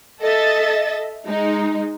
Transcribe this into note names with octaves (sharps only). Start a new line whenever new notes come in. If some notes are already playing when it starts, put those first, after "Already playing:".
A4 D#5 E5 A6
G#3 D#4